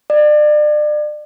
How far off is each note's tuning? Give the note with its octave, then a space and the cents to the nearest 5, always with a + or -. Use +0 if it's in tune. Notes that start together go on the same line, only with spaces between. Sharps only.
D5 +35